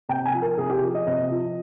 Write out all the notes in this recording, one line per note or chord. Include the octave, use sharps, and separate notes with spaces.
C3 G5
G#5
F3
A#4
C3 G#4
G4
F3
D#5
C3 D#5
F3